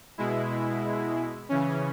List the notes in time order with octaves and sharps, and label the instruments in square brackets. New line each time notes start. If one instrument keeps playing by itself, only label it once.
[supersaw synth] B2 G#3 E4
C#3 E3 C#4